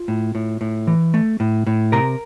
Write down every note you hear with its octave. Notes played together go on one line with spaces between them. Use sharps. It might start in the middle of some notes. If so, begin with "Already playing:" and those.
Already playing: F4
A2
A2
A2
E3
A3
A2
A2
C3 A#4 A#5